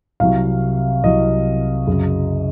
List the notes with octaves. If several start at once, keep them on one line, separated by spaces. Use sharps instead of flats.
C2 C3 F#3 F5
C2 C3 F#3 D#5
F#2 C#3 F#3